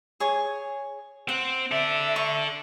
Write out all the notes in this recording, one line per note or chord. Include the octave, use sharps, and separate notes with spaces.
G#4 C#5
C4 F#5
A4 D5 E5
C#6